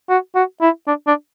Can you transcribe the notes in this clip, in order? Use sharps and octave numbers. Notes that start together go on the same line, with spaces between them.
F#4
F#4
E4
D4
D4